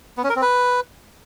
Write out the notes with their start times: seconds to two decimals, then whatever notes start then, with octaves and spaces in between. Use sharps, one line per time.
0.17 B3
0.24 C#4
0.30 A#4
0.36 C4
0.42 B4